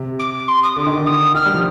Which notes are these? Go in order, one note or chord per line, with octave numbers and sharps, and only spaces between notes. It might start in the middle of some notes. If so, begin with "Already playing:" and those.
Already playing: C3
D6
C6
D#6
D3 D6
D#3
D3
D#6
D#3 F6
G3
F3